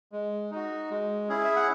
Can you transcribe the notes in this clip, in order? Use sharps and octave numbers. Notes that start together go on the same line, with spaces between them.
G#3
D#4 F#4
G#3
C#4 E4 G#4
E5
F#5